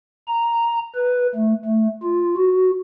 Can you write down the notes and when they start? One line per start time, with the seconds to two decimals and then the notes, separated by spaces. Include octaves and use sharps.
0.28 A#5
0.95 B4
1.36 A3
1.65 A3
2.03 F4
2.37 F#4